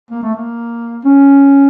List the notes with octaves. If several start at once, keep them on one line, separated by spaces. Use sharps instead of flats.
A#3
A3
A#3
C#4